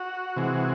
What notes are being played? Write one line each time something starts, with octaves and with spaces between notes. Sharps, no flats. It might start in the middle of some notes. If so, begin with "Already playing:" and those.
Already playing: F#4
C3 E3 G#3